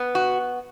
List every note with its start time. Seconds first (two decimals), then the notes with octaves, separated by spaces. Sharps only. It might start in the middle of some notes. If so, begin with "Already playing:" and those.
Already playing: B3
0.15 F#4